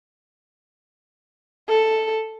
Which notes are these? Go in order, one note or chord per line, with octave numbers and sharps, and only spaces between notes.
A4